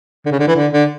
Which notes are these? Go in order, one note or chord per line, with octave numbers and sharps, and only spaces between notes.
D3
C#3
D3
E3
D3
D3